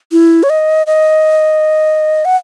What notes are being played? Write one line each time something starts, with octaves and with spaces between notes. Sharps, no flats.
E4
C#5
D#5
D#5
F#5